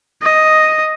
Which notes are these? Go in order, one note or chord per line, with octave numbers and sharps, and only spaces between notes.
D#5